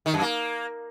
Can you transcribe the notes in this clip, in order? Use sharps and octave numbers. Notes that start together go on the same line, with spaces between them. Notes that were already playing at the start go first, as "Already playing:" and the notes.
D#3
F#2
A#3